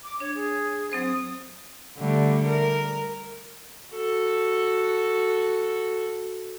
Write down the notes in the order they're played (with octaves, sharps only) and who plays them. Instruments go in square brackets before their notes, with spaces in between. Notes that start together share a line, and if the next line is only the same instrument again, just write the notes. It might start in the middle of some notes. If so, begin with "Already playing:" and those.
[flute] D6
[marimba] D4 [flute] C#5
[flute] G#4
[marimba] F#3 C4 C5 [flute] D#6
[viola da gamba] D3 G3 A3
A#4
[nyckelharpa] F#4 A4